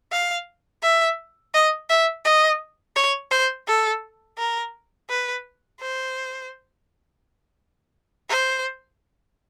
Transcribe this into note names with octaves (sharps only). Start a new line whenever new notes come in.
F5
E5
D#5
E5
D#5
C#5
C5
A4
A#4
B4
C5
C5